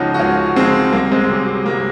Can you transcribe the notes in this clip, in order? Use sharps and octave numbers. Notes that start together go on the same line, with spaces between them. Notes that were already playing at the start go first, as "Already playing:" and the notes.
Already playing: C#2 C#3 F3 C#4 D#4 F#4
F#4
C#2 C#4 F4
C#3 F3 G#3 C4
C2 A#3
G#3 C4
C3 F#3
C2 A#3